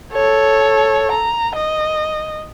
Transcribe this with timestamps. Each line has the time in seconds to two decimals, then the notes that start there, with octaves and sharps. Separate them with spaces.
0.13 A4 C#5
1.12 A#5
1.56 D#5